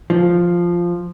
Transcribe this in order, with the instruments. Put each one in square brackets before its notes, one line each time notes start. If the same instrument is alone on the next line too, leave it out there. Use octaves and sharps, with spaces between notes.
[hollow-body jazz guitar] F3